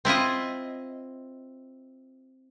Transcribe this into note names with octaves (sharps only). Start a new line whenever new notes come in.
C4 E4 F4 D#5